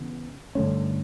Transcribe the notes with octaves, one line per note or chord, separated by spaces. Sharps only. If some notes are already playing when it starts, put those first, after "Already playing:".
Already playing: C#3 E3 B3
G2 D3 A3 C#4